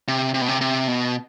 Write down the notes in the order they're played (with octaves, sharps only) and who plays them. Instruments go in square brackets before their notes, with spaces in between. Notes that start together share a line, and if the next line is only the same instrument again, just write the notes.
[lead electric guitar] C3
C3
B2
C3
C3
B2